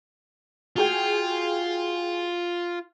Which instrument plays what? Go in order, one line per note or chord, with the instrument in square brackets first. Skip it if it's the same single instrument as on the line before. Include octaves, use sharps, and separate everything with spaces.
[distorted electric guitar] F4 [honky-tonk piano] F#4 G#4 G5